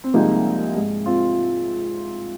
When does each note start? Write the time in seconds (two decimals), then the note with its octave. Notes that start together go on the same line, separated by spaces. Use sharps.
0.04 C4
0.14 C2 C3 F3 G#3 A#3 D#4
0.76 G#2 G#3
1.06 C4 F4